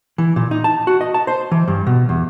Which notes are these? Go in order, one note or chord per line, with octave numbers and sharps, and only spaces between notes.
E3
A#2
D#4
A5
F#4
D#5
A5
C5
E3
G2
B2
E2